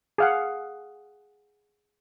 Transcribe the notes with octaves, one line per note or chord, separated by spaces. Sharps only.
G#4 F5 F#5